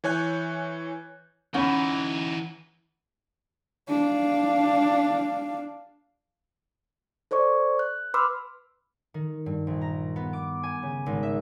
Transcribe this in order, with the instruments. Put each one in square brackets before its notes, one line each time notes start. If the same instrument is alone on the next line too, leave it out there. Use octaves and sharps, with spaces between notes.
[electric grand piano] E3 C#5 G#5 F#6 G6
[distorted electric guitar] E3 D#4 [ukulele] C#4 [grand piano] F#5 B5
[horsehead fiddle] D4 F5
[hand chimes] A4 C5 D5 C#6
F#6
B4 B5 C6 D6 E6 F6
[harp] D#3
G2
A#1
A#5
B3
D6
G#5
C#3
G#1
E5